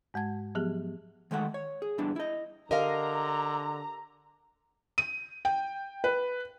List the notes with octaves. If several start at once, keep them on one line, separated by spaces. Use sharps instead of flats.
G#2 G#3 A5 G#6
F3 F#3 B3 G4 G#4
D#3 G#3 A3 F#5
C#5
G#4
E2 G2 E3 B3 D4
E4 D#5
D3 G4 A#4 D#5 F5 A#5
D#7
G5
B4